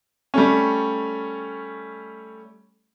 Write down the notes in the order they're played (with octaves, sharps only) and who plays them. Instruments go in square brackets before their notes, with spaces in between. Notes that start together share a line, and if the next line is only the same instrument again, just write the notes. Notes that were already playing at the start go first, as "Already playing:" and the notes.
[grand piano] G3 A3 C#4